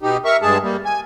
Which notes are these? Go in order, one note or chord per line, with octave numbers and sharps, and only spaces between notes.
B2 D#4 G4
A#4 E5 C#6
G2 G#3 G#4 A5
G3 A#3
G#5